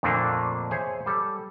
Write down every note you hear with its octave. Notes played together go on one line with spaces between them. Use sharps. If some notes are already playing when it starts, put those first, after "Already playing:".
F2 A#2 D3 A3 A#3 D4
G#4 C5 C#5 E5 G#5
G3 A4